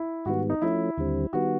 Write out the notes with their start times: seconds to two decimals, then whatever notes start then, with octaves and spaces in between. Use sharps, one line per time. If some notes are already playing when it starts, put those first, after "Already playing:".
Already playing: E4
0.25 G#2 D#3 G3 B3 F#4
0.50 D#4
0.62 F3 A3 C#4 E4
0.97 D#2 D3 G3 C4
1.33 D#3 G3 B3 F#4